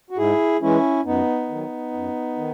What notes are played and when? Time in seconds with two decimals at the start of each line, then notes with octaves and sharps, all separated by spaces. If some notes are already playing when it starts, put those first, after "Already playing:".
0.10 F#4
0.17 G#2 E4 G#4
0.61 E3 G#3 C#4 E4
1.05 F#2 B3 D#4
1.49 D#3 F#3
1.93 F#2
2.37 D#3